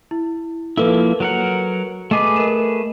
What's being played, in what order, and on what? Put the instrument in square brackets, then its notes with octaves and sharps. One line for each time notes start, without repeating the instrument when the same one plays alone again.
[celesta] E4
[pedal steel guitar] F3 A#3 E4 [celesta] A4 B4
[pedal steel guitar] F#3 A#4 F#5
[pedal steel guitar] A3 G#4 B4 [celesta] D#5 D6
[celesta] A#4 D#5 E7